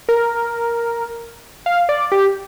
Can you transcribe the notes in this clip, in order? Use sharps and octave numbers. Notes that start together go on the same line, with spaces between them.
A#4
F5
D5
G4